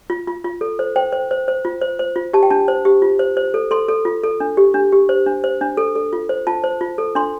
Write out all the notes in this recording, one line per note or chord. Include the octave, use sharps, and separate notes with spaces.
F4
F4
F4
A4
C5
C5 G5
C5
C5
C5
F4
C5
C5
F4
G4 A5
G5
D4 A5
C5
G4
F4
C5
C5
A4
A4 C6
A4
F4
A4
D4
G4
D4
G4
C5
D4
C5
D4
A4
A4
F4
C5
F4 A5
C5
F4
A4
D4 C6